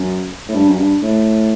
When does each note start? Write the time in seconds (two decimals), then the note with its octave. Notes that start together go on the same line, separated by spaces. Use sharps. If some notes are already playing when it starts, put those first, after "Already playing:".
Already playing: F#2
0.48 A2
0.55 G2
0.69 F#2
0.78 G2
1.03 A2